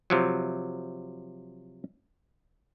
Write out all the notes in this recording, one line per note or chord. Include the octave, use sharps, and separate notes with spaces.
C3 F3 F#3